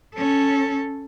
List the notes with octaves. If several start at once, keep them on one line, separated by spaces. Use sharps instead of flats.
C#4 A4